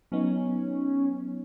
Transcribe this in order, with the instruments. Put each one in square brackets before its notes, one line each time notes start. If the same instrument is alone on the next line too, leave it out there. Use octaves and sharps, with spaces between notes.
[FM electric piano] F#3 B3 D#4 [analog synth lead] C#4